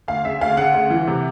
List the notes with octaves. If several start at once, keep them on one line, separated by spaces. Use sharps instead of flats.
D2 F5
C#3 E5
D2 F5
C#3 F#5
D2
E3
C3